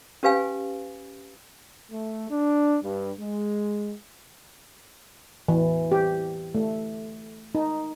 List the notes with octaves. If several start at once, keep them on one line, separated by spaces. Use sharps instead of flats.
C#4 G4 B4 F5 G#5
A3
D4
G2
G#3
E3
G4
A3
D#4